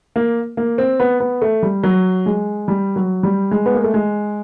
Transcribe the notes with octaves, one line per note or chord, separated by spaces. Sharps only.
A#3
A#3
C4
B3
B3
A3
G3
F#3
G#3
G3
F#3
G3
G#3
B3
A#3
A3
G#3